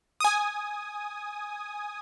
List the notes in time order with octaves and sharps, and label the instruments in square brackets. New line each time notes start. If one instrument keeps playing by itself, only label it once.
[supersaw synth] G#5 D#6